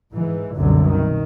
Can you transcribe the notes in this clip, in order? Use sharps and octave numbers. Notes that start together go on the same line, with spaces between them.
G#2 E3
C2 F#2 B2 D3 F#3
D#3